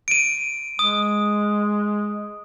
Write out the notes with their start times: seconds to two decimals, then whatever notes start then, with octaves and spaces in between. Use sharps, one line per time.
0.08 D7 D#7
0.79 G#3 D#6